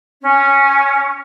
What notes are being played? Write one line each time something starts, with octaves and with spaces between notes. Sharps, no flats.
C#4